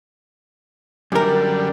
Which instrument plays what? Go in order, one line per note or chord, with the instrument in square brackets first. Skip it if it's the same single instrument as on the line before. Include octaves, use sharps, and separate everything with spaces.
[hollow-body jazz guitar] F#2 A#4 [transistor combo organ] D3 G3